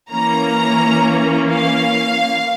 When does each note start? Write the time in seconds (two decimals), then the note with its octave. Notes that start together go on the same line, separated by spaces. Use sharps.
0.11 E3 A#3 C#4 A#5
1.51 F5